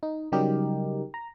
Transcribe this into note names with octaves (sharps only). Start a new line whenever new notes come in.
D#4
C#3 F#3 G3 D#4 G4 A#4
A#5